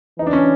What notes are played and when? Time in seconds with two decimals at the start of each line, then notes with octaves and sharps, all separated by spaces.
0.19 E3 D#4
0.27 D4
0.33 C#4